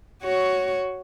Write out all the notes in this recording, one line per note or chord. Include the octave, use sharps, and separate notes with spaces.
F#4 C#5